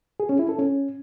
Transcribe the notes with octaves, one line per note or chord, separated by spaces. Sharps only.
G#4
C#4
E4
A4
C#4